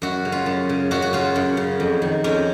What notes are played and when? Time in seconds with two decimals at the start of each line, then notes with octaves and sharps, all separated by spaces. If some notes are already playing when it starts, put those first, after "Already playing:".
0.02 F#2 F#4
0.25 C#3
0.32 F4
0.46 F#2
0.69 C#3
0.91 F#2 F#4
1.02 F#4
1.13 C#3 F4
1.36 F#2
1.57 C#3
1.80 F2
2.02 D#3
2.24 F2 C#4